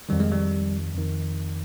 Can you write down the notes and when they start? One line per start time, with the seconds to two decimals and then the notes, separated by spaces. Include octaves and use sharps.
0.09 F2 D#3 G3
0.20 G#3
0.31 G3
0.94 F2 D#3